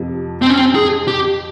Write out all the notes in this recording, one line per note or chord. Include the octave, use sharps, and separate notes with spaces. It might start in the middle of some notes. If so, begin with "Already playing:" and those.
Already playing: F2 C3 F3
C4
C#4
C4
G#4
G4